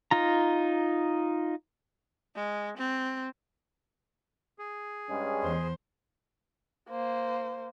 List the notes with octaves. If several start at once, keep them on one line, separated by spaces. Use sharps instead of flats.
D#4 F4 A#5
G#3
C4
G#4
G2 G#3 C#4
E2 C5
A#3 C5